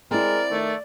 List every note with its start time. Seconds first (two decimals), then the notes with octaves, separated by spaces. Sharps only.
0.11 G#3 C4 E4 A#4 D5
0.51 D#3 A3